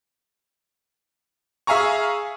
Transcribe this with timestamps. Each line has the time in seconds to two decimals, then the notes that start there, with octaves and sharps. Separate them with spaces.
1.67 G#4 E5 F5 G#5 A#5 C#6